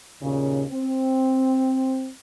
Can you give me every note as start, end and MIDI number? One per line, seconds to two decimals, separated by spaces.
0.21 0.62 39
0.21 0.62 46
0.21 0.62 49
0.70 2.10 60